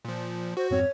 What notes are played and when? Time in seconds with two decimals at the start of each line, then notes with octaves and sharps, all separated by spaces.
0.05 A#2 F3
0.57 F#4 C5
0.70 F2 G#2 C4 C#5